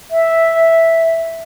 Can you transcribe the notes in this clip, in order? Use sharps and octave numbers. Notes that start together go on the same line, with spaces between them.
E5